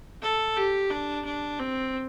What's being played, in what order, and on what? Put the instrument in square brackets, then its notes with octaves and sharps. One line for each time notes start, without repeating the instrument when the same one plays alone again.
[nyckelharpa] A4
G4
D4
D4
C4